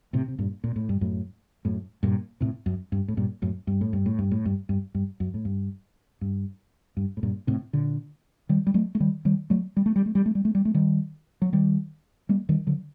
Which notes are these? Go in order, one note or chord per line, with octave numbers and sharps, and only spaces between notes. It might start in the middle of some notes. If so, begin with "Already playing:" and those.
A2 C3
C3
G2 A#2
A#2
A2
G2
F#2 A2
F#2 A2
G2 A#2
A2 C3
F#2
G2
A2
G2 A#2
F#2 A2
G2
A2
G2
A2
G2
A2
G2
G2
G2
F#2
A2
G2
G2
G2
A2
G2 A#2
A2 C3
A#2 D3
D#3 G3
G3
F#3 A3
A3
D#3 G3
D#3 G3
F#3 A3
G3
A3
G3
A3
G3
A3
G3
A3
G3
A3
D#3 G3
F#3
D#3 G3
G3 A#3
D#3 G3
D3 F#3